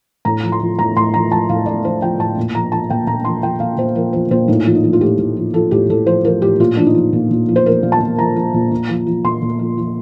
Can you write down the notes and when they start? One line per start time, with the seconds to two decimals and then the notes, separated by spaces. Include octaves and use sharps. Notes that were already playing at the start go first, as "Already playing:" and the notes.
0.25 A2 A#5
0.43 F3
0.52 C6
0.61 F3
0.79 A2 A#5
0.96 A2 C6
1.14 F3 A#5
1.31 F3 A5
1.49 A2 F5
1.66 A2 D5
1.84 F3 C5
2.01 F3 G5
2.19 A2 A5
2.37 A#2
2.55 F3 A#5
2.72 F3 A5
2.90 A#2 G5
3.07 A#2 A#5
3.25 F3 C6
3.43 F3 G5
3.60 A#2 F5
3.77 A#2 C5
3.95 F3 A#4
4.13 F3 C5
4.31 A#2 C5
4.48 A2 D#4
4.66 F3
4.75 D#4
4.84 F3
4.93 F4
5.01 A2 G4
5.19 A2
5.37 F3
5.54 F3 A4
5.71 A2 G4
5.90 A2 A4
6.06 F3 C5
6.25 F3 A#4
6.42 A2 G4
6.60 A#2 F4
6.76 F3 D4
6.86 D#4
6.95 F3
7.13 A#2
7.31 A#2
7.49 F3
7.56 C5
7.66 F3 A#4
7.83 A#2
7.92 A5
8.00 A#2
8.18 F3 A#5
8.36 F3
8.54 A#2
8.71 A#2
8.89 F3
9.07 F3
9.24 A#2 C6
9.42 A#2
9.59 F3
9.78 F3